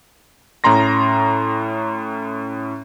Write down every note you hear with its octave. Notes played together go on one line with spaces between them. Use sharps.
A2 C#4 A#5 C6 A#6